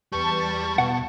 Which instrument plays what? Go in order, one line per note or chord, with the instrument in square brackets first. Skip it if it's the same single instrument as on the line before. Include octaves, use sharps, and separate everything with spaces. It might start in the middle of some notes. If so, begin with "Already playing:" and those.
[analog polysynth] E2 B4 A5 [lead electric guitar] G3 G4 [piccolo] C#6
[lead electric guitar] B2 [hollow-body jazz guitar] F#5